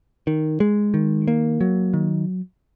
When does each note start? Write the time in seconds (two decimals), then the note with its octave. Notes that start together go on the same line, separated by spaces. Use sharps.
0.27 D#3
0.60 G#3
0.94 D#3
1.28 A#3
1.61 F#3
1.94 D#3